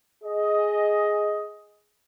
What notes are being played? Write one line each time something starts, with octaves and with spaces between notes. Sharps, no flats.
G#4 D#5